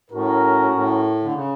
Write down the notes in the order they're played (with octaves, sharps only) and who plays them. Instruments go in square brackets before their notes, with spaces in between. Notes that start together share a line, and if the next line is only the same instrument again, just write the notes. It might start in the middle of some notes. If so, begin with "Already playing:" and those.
[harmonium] A2 [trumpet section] C#4 F#4 A#4
[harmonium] A2
D3
C#3